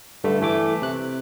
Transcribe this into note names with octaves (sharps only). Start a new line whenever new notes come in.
G2 D3 A3
E3 A3 D6
C3 F#6